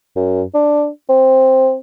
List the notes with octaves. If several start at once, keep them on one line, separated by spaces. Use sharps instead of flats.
F#2
D4
C4